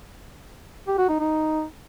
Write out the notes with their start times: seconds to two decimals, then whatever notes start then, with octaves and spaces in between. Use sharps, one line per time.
0.87 G4
0.98 F#4
1.09 D#4
1.19 D#4